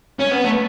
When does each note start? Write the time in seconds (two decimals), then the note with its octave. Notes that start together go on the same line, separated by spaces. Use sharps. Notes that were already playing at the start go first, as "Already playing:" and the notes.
0.19 C#4
0.31 B3
0.45 A3